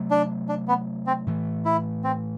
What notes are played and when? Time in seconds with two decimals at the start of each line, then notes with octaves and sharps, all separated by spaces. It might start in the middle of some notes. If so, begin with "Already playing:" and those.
Already playing: C3 F#3 A3
0.11 D4
0.49 D4
0.68 B3
1.07 C4
1.27 A2 E3 A3
1.65 E4
2.04 C4